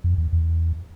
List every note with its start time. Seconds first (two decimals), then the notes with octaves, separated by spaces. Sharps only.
0.04 F2
0.18 E2
0.33 E2